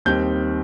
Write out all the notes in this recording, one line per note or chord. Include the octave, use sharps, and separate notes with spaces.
D#2 D#3 G3 C4 D#4 G6